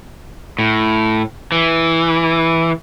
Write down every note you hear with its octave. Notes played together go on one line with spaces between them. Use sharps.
A2
E3